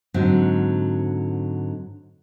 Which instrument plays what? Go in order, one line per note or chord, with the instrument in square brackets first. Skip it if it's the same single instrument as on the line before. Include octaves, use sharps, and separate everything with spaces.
[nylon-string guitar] G#2 D3 F#3 C4